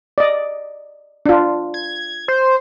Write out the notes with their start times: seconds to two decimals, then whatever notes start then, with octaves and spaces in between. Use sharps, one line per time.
0.18 D5 D#5
1.26 D4 F4
1.74 G#6
2.28 C5